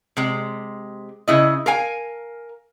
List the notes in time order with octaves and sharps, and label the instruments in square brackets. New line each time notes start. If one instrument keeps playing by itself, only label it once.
[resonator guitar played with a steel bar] C3 G#3
C#3 E4 D#5
A#4 F5 G#5